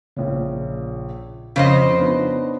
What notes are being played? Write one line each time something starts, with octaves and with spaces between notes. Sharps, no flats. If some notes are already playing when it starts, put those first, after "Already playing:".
A#1 A#2 C#3
F2 C#3 F3 C5 D#5 D7
B3 D4 D#4